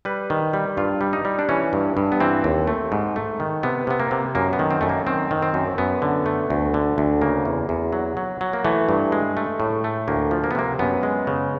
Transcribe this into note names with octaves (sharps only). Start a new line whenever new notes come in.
G3 B4
D#3
G3
G2 F4
G3
D#4
G3
D4
E3 C#4
G2
G2
B3
E3 C4
D#2
A3
G#2
A3
D#3
C3 B3
C3 B3
A#3
C3
F#2 A#3
B3
D#3
C4
F#2 A3
A#3
D#3 C4
D#3
C4
F#2
F#2 B3
D3
A3
D2
D3
D2
C#3 A#3
E2
E2
F#3
F#3
F#3
A#3
E3 A3
G2
G#3
A3
A2
A3
D2 A#3
F3
A#3
B3
C3 A#3
F#2 B3
G#3
C#3